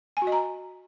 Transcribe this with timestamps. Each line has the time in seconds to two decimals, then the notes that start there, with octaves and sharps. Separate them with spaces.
0.17 G#5
0.22 F#4
0.27 D#5
0.32 A#5